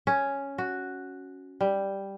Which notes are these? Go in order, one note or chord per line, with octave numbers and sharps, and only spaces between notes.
C#4
F#4
G3